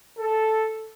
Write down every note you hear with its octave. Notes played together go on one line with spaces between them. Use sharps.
A4